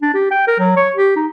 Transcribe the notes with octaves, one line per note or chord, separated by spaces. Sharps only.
D4
G4
G5
A#4
F#3
C#5
G4
D#4